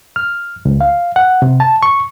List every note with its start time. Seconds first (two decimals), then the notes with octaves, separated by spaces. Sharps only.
0.16 F6
0.65 C#2
0.81 F5
1.16 F#5
1.42 C3
1.60 A5
1.83 C#6